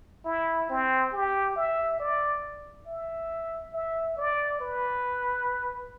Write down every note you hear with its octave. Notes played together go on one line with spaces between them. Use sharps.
E4
C4
G4
E5
D5
E5
E5
D5
B4